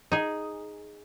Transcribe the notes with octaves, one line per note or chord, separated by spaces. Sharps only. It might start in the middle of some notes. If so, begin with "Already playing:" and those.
D#4 G#4